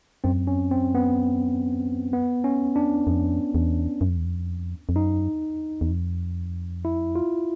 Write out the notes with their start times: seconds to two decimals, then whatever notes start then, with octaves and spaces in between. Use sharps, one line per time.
0.24 F#2 C4
0.47 C#4
0.71 C4
0.95 B3
2.13 B3
2.44 C#4
2.76 D4
3.07 F2
3.55 E2
4.01 F#2
4.09 F2
4.17 E2
4.25 F2
4.89 F2
4.95 F#2 D#4
5.81 E2
5.90 F2
6.85 E4
7.15 F4